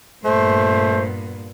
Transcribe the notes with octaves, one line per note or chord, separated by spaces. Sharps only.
G2 A#2 A3 B3 C5